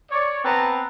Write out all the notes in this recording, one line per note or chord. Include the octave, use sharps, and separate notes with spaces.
C#5 D5
B3 C4 B4 A5 A#5